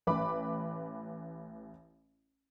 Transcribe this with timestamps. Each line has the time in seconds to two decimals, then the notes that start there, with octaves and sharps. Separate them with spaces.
0.07 A1 B4 B5 D6